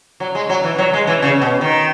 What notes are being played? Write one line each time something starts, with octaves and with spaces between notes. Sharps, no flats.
F#3
G#3
F#3
E3
F#3
G#3
E3
C#3
B2
D#3